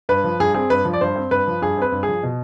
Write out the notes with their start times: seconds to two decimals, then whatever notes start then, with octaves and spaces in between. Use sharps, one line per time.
0.09 G2 B4
0.24 F3
0.40 G2 G#4
0.55 C4 G#4
0.70 G2 B4
0.85 F3
0.93 D5
1.01 G2 C5
1.16 C4
1.31 G2 B4
1.47 F3
1.62 G2 G#4
1.77 C4 B4
1.92 G2
2.03 G#4
2.08 F3
2.23 B2